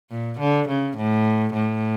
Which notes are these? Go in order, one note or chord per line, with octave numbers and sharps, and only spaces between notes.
A#2
D3
C#3
A2
A2